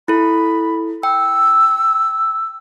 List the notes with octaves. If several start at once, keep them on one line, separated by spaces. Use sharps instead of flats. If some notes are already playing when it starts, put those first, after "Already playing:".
E4 A4 B5
G5 E6